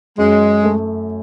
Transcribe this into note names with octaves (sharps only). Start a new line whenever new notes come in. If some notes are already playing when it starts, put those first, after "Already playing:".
F#2 G#3
A3